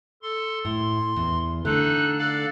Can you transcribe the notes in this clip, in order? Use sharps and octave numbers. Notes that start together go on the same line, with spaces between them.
A4 C6
A2 C6
E2
D3 A3 D4 D#4 A4 F#6
A4 D5 F5